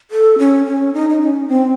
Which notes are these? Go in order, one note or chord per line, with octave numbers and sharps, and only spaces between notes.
A4
C#4
C#4
D#4
D#4
C#4
C4